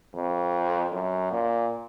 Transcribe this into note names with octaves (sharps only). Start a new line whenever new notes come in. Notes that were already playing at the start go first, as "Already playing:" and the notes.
F2
F#2
A#2